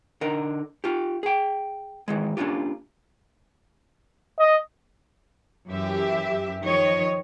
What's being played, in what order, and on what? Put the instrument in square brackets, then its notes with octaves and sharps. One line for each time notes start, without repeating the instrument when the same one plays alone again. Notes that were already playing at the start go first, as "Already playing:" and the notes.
[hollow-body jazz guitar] D3 D#4 A#4
F4 G4
G#4 G5
D#3 E3 G#3
A#3 C#4 D4 F4 G4
[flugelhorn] D#5
[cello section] F#2 E3 G4 E5
D#3 F3 C#5 D#5